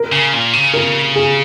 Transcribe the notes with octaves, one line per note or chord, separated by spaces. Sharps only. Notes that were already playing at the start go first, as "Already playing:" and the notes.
Already playing: A#4
C#3
A#2
C#3
A#4
G#4